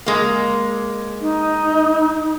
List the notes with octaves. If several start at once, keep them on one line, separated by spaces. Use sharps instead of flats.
G#3 A#3
D#4